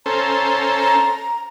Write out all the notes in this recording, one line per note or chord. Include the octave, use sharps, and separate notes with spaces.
C#4 A4 C5 A#5